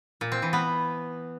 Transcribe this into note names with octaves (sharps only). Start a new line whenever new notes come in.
A#2
C4
E3
B3